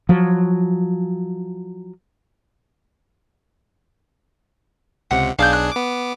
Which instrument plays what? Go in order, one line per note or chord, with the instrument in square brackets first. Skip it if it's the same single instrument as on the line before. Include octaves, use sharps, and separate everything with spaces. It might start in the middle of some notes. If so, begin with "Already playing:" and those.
[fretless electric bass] F3 F#3
[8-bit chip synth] C#2 C3 [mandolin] F#5
[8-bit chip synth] B1 D4 G#4 [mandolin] F5 G6
[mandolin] F#6
[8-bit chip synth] B3 D6